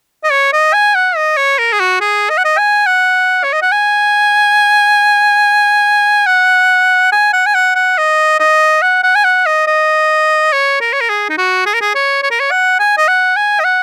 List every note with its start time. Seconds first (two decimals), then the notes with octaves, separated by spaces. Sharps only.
0.24 D#5
0.31 C#5
0.53 D#5
0.73 G#5
0.95 F#5
1.16 D#5
1.37 C#5
1.59 A#4
1.73 G#4
1.80 F#4
2.01 G#4
2.29 D#5
2.38 F#5
2.45 D#5
2.58 G#5
2.86 F#5
3.44 C#5
3.53 D#5
3.62 F#5
3.72 G#5
6.26 F#5
7.12 G#5
7.33 F#5
7.46 G#5
7.55 F#5
7.75 F#5
7.98 D#5
8.39 D#5
8.82 F#5
9.03 F#5
9.15 G#5
9.24 F#5
9.46 D#5
9.67 D#5
10.53 C#5
10.81 A#4
10.93 C#5
11.01 A#4
11.09 G#4
11.29 D#4
11.38 F#4
11.66 G#4
11.74 A#4
11.81 G#4
11.95 C#5
12.23 C#5
12.31 A#4
12.40 C#5
12.51 F#5
12.80 G#5
12.97 D#5
13.08 F#5
13.36 G#5
13.60 D#5
13.64 F#5